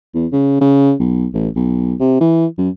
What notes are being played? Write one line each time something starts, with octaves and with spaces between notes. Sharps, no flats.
E2
C#3
C#3
B1
A1
B1
C3
E3
F#2